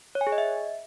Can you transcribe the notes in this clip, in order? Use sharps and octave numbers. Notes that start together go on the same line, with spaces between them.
C#5
G#5
G#4
D#5
E5